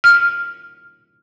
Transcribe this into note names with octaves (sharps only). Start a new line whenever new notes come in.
F6